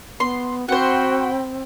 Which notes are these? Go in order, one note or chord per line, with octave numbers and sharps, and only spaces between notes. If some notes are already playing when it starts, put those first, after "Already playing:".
B3 C6
C4 F#4 C5 F#5 G5 B5